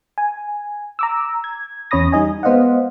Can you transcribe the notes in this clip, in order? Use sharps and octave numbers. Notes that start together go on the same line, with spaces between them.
G#5
A#5 D6 E6
G#6
E2 C#4 C#5 B5 D#6 A#6
G3 D#4 D#5 G#5
G#3 B3 C5 D#5 F5 F#5